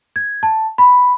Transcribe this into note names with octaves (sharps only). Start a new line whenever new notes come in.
G#6
A5
B5